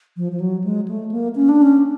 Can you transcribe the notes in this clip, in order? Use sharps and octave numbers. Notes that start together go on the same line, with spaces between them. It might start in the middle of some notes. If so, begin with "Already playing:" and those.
F3
F3
F#3
G#3
A3
A#3
C#4
D4
C#4